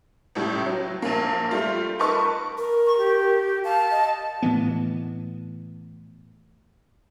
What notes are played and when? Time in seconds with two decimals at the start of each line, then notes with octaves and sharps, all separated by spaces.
0.35 C#2 A2 G3
0.66 F#3
1.02 A#1 A#3
1.51 G3 A3 F4
1.99 D#4 A#4 B4 A5 C#6
2.57 A#4
2.86 C#6
2.98 G4
3.64 F5 A5
3.91 D#5
4.42 A2 E3 B3